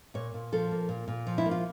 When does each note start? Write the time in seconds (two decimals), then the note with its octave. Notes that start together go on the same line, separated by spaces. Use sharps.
0.14 A#2 C#5
0.34 A#2
0.52 F3 A4
0.71 A#3
0.89 A#2
1.08 A#2
1.27 F3
1.38 E4
1.46 A#3
1.51 F4